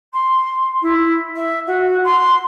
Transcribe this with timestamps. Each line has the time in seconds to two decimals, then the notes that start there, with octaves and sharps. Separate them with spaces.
0.13 C6
0.81 E4
1.35 E5
1.66 F#4
2.04 C6